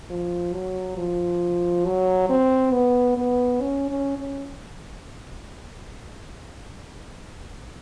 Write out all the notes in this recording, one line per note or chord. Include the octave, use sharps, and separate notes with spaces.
F3
F#3
F3
F#3
C4
B3
B3
C#4
C#4
C#4